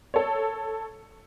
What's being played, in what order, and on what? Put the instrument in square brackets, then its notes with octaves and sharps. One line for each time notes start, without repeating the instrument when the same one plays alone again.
[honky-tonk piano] A4 C#5